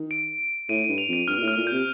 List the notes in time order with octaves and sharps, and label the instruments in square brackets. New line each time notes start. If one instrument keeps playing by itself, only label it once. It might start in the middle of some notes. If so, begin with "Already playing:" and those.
Already playing: [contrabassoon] D#3
[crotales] D7
[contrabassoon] A2 [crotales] D#7
[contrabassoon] G2 [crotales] D#7
[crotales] F7
[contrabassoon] F2 [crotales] D#7
[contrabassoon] G2 [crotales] F6
[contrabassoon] A#2
A2
[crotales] F6
[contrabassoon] A#2
[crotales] G6
[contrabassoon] C3